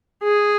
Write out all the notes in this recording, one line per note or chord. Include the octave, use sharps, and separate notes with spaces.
G#4